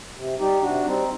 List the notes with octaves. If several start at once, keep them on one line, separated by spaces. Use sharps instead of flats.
C3
G3 D#4 G4
C3 D4 F#4
G3 C4 D#4